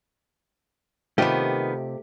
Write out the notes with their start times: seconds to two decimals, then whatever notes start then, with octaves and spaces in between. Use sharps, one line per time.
1.18 C3 D#3 A3 B3 F4 G4 D#5